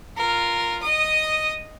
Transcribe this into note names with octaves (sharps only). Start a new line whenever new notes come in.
F4 A#4
D#5 D#6